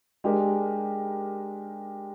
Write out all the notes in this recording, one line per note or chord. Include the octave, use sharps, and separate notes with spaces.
G#3 D4 G4 A#4